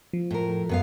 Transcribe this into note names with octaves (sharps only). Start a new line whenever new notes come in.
F3
A2 A#4
F#2 B3 F5